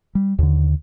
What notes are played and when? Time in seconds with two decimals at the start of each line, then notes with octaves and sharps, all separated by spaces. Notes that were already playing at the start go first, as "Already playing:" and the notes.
0.15 G3
0.39 D#2 D3